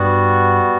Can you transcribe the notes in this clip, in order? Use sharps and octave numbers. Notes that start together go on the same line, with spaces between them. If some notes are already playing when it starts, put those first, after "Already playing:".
Already playing: G2 G3 B3 F#4